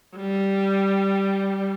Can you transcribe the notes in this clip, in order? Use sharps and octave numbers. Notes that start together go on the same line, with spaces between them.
G3